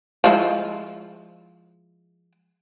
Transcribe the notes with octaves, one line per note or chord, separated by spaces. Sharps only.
F3 G#3 E4